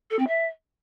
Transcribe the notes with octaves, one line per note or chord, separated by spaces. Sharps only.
A4
C4
E5